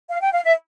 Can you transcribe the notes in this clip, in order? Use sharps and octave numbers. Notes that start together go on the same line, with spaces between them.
F5
G5
F5
E5